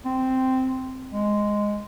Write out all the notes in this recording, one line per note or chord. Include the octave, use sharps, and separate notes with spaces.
C4
G#3